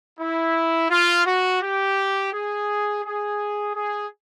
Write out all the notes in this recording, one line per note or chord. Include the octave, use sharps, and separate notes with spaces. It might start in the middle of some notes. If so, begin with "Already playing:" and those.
E4
F4
F#4
G4
G#4
G#4
G#4